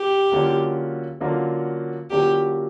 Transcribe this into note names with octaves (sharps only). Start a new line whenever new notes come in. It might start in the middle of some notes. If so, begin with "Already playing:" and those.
Already playing: G4
D3 F#3 A#3 C#4 F4
D3 F#3 A#3 C#4 F4
D3 F#3 A#3 C#4 F4 G4